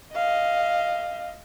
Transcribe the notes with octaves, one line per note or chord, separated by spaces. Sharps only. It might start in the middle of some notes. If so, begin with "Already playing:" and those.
D#5 F5